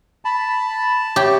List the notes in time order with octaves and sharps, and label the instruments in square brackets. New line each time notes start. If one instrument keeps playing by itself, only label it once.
[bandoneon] A5 [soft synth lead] B5
[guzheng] G4 [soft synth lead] C#5